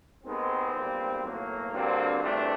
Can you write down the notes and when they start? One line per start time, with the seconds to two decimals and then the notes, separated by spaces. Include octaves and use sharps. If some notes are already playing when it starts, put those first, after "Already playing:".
0.24 D#2 D#3 G#3 B3 C4
0.73 B1 A#2 G3
1.23 B1 A2 F#3 A#3
1.72 G2 D3 F#3 A#3 C4
2.22 G#1 G2 E3 A3 C4 D4